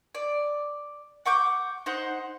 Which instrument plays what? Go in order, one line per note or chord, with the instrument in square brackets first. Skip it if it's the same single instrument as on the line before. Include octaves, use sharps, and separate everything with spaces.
[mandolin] D5
F#5 C#6 D6 G6
D#4 C5 F#5